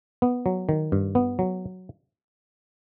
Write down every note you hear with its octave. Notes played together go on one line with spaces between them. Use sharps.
B3
F#3
D#3
G2
B3
F#3